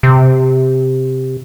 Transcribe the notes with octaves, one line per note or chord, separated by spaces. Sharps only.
C3